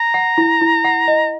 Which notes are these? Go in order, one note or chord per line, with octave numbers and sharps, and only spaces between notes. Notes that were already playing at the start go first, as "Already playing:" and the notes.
Already playing: A#5
F#5
E4
E4
F#5
D#5